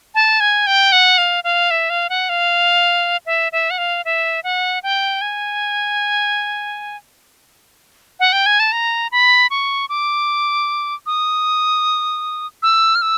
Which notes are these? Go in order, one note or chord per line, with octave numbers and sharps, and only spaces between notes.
A5
G#5
G5
F#5
F5
F5
E5
F5
F#5
F5
E5
E5
F#5
F5
E5
F#5
G5
G#5
F#5
G5
G#5
A5
A#5
B5
C#6
D6
D#6
E6
F6
E6